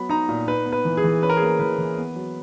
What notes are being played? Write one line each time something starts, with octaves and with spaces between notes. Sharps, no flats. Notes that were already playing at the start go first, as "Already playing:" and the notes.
Already playing: F#3 B3 B5
D#4 A#5
A#2
D#4 B4
B3
B4
E3
G#4
E3
C#4 B4
A#4
G#4
A#3 A#4
E3 B4
E3
B3
F#3